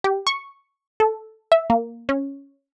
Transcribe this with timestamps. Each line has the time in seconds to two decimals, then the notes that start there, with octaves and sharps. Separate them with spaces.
0.04 G4
0.27 C#6
1.00 A4
1.52 E5
1.70 A#3
2.09 C#4